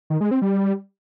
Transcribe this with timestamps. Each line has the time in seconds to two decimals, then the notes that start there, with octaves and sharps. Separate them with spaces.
0.10 D#3
0.21 G#3
0.31 C4
0.42 G3